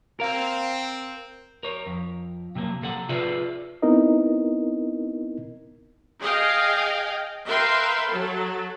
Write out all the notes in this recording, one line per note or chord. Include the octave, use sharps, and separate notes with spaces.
C4 A#4 F5
A#4 C#5
F2
C3 F#3 A#3
C3 A4 F#5
F4 G#4 A4 B4 D5 E5
B3 C4 D#4 E4 A#4 D#5
G#4 D#5 F5 G5
A#4 B4 E5 F5 G5 C6
F#3 A4